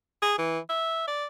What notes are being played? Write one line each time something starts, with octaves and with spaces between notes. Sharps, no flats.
G#4
E3
E5
D5